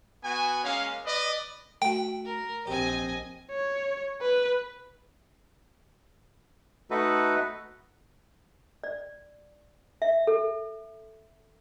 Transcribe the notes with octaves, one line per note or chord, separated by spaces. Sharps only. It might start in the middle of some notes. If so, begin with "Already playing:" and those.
B3 F#4 G#5
G#3 A#3 C#4 F5
B4 D5 D#5
A3 F#4 G5
A#4
A#1 C4 G4 D#5 G#5
C#5
B4
A3 D#4 F#4 A4 B4
D5
E5
A4